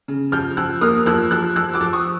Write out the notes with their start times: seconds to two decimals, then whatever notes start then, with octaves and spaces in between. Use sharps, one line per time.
0.08 C#3
0.32 F3 F6 G6
0.57 F3 E6 F#6
0.81 A#3 D#6 F6
1.06 F3 E6 F#6
1.31 F3 E6 F#6
1.56 F3 E6 F#6
1.74 D6 E6
1.81 F3
1.93 C#6 D#6